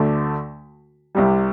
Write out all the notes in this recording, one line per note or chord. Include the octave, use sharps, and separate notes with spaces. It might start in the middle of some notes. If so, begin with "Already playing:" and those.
Already playing: D2 D3 A3
C2 C3 G3